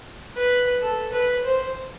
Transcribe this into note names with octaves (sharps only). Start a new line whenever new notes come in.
B4
A4
B4
C5